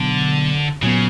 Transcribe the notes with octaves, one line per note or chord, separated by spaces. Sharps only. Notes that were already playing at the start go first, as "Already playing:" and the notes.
Already playing: B2 D3 F#3 B3
A#2 C#3 F#3 B3